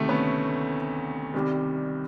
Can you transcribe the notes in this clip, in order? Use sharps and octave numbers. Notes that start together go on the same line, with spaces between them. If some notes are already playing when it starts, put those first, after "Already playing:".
Already playing: D2 C3 D#3 A3
B3 C#4
C2 C3 D#3 G3